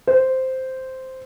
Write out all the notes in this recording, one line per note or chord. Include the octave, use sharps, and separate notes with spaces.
C5